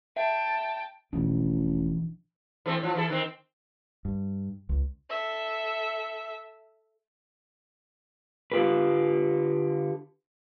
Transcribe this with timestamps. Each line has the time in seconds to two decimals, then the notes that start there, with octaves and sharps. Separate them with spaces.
0.16 E5 G5 A5
1.13 E1 A1 E3 F3 D4
2.66 E3 A3 C4
2.80 A2 F3
2.95 E3 E4 A4
3.10 D#3 C4
4.05 G2
4.69 C#2
5.10 A4 E5
8.52 D3 F4 G4 B4